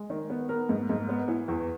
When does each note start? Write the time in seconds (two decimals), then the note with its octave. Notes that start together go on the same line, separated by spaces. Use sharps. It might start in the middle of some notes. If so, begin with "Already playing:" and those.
Already playing: G#3
0.10 D#3
0.30 B3
0.49 B3 A#4
0.69 G#2
0.90 G#2
1.09 B3
1.28 E3
1.48 E2